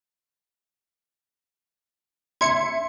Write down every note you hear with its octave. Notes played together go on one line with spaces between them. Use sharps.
E5 C6 G#6 C#7